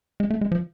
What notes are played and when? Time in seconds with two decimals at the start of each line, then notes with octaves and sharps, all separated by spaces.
0.20 G#3
0.30 A3
0.41 G#3
0.52 F3